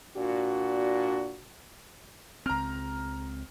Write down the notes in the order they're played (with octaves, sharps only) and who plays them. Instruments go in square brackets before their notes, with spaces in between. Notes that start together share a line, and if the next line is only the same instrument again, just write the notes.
[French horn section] A#2 D4 F#4
[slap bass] C#2 C4 [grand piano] A#5 F6